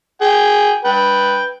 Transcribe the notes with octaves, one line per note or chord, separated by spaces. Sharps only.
G#4 G5
B4 G5